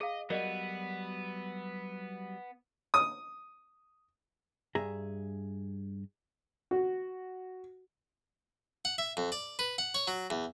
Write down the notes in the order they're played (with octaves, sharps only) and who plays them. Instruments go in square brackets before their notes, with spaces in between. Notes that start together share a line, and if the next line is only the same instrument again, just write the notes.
[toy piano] G#4 F5 [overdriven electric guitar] D#5
[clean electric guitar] F#3 G3 F#4 [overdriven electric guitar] B3 [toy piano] A#4 D5 D#5
[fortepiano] D#6
[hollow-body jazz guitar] G2 G#4 E5 A#5
[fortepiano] F#4
[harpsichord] F#5
E5
F2
D5
B4
F#5
C#5
F#3
E2